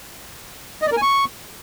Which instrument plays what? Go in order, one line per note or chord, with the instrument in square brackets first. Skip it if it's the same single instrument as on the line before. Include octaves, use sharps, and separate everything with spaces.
[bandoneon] D#5
D5
A#4
G#5
C#6